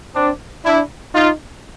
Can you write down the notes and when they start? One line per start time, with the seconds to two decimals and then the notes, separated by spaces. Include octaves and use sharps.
0.14 C4 D4
0.64 D4 E4
1.14 D#4 F4